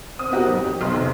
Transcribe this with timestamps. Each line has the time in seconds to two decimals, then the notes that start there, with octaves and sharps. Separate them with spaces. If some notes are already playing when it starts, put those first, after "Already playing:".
0.19 C4 D#6
0.30 B3 C4 D#4 F#4 G4 A#4
0.45 A1 F2 F#3
0.64 G4
0.81 B1 C4 C6
0.94 E2 C3